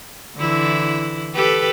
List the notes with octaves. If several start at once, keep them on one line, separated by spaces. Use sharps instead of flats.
D3 E3 E4
G4 A4 B4